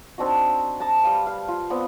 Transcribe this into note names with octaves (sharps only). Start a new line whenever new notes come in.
C4 D4 D#4 F#4
A5 A#5 D6 D#6
G3 B4 F5 G5
F5
F4
B3 C4 D5